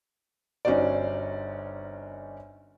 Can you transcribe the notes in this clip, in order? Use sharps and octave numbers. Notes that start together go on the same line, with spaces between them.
G1 C#4 D#4 F#4 C5 D5